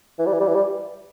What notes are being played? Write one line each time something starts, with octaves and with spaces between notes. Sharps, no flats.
E3
G3
E3
G3
E3
G3